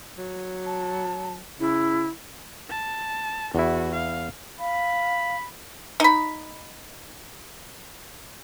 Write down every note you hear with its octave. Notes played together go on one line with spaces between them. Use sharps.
F#3
A5
C#3 E4
A5
E2 E4 F#4
F5
F5 B5
D#4 B5